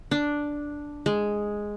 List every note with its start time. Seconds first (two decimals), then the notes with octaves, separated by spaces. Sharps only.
0.11 D4
1.06 G#3